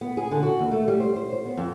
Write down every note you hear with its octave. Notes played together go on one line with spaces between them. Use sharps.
B3
G#4
D3
F#4
D#2
A3
G3
C5
C5
C5
B3
F2